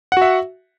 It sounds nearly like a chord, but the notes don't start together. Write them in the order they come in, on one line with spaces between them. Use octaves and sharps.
F#5 F#4 E5